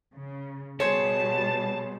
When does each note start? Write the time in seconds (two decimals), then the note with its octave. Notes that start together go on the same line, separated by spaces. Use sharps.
0.14 C#3
0.80 B2 G3 G#4 C5 C#5 A5